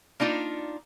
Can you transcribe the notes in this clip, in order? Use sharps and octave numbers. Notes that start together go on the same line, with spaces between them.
A#3 D4 D#4 F4